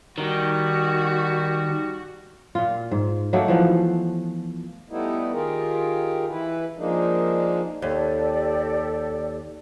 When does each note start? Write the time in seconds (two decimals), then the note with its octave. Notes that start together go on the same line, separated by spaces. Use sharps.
0.18 D#3 G3 F#4
2.55 A#2 F4
2.91 G#2
3.33 F#3 A3 A#3 D#4
3.48 E3 F3 B3
4.90 G3 A3 B3 D#4 E4
5.32 D#3 F4 G4 G#4 A#4
6.30 E3 E4 B4
6.77 F3 G#3 A#3 D4 D#4
7.82 D#2 G4 A4 D5